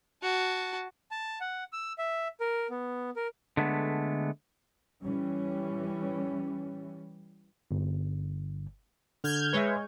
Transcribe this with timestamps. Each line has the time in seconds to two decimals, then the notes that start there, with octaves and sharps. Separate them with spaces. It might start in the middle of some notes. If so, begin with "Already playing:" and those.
0.22 F#4 A5
1.11 A5
1.40 F#5
1.73 E6
1.98 E5
2.40 A#4
2.70 B3
3.16 A#4
3.57 D3 G#3 A3 B3
5.02 E3 G3 C#4
7.71 G1
9.24 D3 F6 G6 G#6
9.53 G#3 B4 C#5 E5